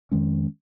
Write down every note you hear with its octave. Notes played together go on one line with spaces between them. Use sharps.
F2 D#3 G#3 C#4